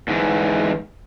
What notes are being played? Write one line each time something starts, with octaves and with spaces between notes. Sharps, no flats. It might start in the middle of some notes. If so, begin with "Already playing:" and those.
G#2 E3